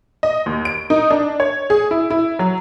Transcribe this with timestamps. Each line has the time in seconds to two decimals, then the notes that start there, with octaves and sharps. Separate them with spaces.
0.23 D#5
0.46 D#2
0.65 D7
0.90 D#4
1.11 D4
1.40 C#5
1.70 G#4
1.91 E4
2.10 E4
2.39 F#3